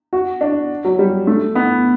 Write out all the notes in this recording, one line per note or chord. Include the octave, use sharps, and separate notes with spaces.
F#4
D4
F#3
G3
A3
B3